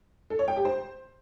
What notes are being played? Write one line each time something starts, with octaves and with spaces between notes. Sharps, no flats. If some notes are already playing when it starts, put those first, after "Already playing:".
A4
C#5
G5
G4
C5